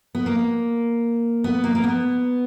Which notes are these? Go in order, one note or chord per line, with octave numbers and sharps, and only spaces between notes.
B3
A#3
B3
A#3
A#3
B3